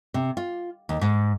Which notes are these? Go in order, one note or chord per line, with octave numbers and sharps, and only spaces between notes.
C3
F4
D#2
G#2